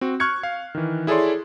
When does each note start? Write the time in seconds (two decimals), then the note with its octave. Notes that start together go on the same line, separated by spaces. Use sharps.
0.01 C4 F#4
0.20 C#6 F6 F#6 G#6 C#7
0.43 F5
0.75 D#3 E3
1.07 E4 G#4 A4 C#5 D5 C6